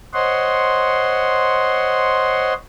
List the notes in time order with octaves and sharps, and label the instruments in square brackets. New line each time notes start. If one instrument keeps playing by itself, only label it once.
[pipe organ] C5 C#5 D#5 F#5 C6